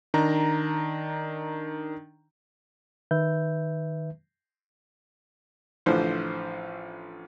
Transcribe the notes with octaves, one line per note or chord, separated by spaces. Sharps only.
D#3 D4 A#5
D#3 B4 E5 G6
A1 D3 E3 F3 C5